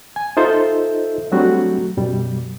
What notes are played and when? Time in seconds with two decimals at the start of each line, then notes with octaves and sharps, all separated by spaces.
0.16 G#5
0.37 D#4 F4 A4 C5 D#5 E5
1.32 F#3 G3 A3 C4 D4 F#4
1.97 F#2 B2 G3